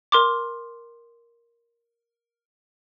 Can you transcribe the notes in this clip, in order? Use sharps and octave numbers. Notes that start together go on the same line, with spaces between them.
A#4 C6 D6